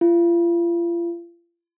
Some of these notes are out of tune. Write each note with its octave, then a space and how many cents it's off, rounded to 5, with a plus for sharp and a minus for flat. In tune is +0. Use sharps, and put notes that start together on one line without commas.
F4 -40